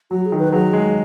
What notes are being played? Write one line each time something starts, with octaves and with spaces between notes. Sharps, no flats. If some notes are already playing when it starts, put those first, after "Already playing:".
F#3 F#4
G#4
D#3
B4
F#3 G#4
G#3